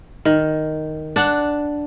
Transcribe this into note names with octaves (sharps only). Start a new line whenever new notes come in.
D#3
D4 F#5